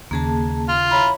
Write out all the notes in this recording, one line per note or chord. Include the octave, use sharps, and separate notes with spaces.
D#2 C#3 A#3 G#4 A5
F4
E4 C#5 A#5 B5